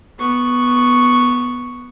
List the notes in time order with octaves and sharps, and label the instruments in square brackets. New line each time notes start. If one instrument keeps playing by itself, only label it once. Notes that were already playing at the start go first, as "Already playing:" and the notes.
[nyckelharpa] B3 C#6